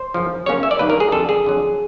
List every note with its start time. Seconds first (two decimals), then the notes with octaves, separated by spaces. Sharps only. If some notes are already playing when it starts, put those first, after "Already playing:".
Already playing: C5
0.14 F#2 C#3 F3
0.46 C#3 F#3 A#3 C#4 C#5
0.63 E5
0.71 D5
0.79 G2 D#3 F#3 A#3 B4
0.90 A#4
1.00 G#4
1.12 F2 D3 G3 A4
1.29 G#4
1.45 F2 D3 F#3